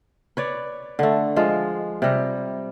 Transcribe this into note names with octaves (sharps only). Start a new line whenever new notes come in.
B4 C#5 D5
D3 A3
F3 G#3 F4
C3 G3